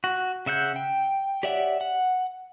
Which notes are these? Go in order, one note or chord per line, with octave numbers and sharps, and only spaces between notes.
F#4
C#3 E5 F#5 G6
G5
G4 C#5 D5 E5 F#5
F#5